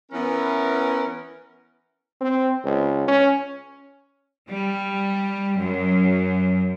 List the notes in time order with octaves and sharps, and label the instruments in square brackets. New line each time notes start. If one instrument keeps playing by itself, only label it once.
[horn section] E3 B3 C#4 E4 A#4
[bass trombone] C4
C#2
C#4
[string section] G3
F#2